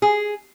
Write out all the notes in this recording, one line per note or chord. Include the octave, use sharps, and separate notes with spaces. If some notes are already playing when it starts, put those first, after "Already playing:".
G#4